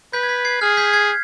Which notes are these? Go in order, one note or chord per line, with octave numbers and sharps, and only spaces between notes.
B4 G6 B6
G#6
G6 B6
G#6 C7
G#4 F6 G#6
G6 B6
G#6 C7